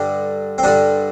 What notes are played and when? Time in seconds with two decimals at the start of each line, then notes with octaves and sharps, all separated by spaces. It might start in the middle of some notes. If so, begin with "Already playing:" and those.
Already playing: G2 D3 G3 D4
0.58 C4
0.63 G2 D3 G3 D4